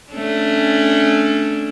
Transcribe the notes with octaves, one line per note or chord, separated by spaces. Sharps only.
A3 C#4 D4